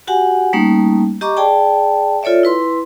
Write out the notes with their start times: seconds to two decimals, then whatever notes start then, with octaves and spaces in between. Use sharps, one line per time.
0.07 F#4 G4 F#5 G#5
0.53 G3 A3 A#3 C#4 D#4
1.21 G4 D#5 A#5 C#6 D6
1.37 G#4 D5 G5 A5
2.23 F4 A4 C#5 D5 E5
2.43 E4 B4 C6